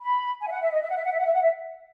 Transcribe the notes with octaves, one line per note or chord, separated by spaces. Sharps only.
B5
G#5
E5
F#5
E5
D#5
E5
F#5
E5
F#5
E5
F#5
E5
F#5
E5